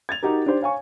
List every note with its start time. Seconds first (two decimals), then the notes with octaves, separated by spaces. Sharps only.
0.09 G#6 A6 F7
0.23 D#4 F#4 G4 A#4
0.46 D4 G4 C5
0.61 C#5 F5 G#5 C#6